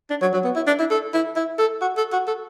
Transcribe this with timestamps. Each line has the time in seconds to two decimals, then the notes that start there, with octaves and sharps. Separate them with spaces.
0.10 D4
0.22 F#3
0.33 F#3
0.44 B3
0.56 E4
0.67 D4
0.79 E4
0.91 A4
1.14 E4
1.36 E4
1.59 A4
1.81 F#4
1.97 A4
2.12 F#4
2.27 A4